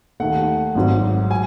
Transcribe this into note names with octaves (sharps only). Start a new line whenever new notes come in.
D#2 D#3 A3 F#5
G#1 G#2 F#3
G#5